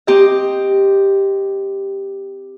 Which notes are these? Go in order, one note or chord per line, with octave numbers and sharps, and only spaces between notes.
C4 G4 D#5